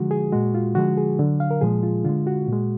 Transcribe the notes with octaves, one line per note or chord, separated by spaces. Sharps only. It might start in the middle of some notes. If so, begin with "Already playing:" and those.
Already playing: D3 F3 G#3 F#4
G#4
A#2 G#3 F#4
F4
D3 F3 G#3 F#4
G#4
D3 F#3
F5
A#4
A#2 F3 G#3 G#4
F4
D3 G#3 F4
F#4
A#2 G#3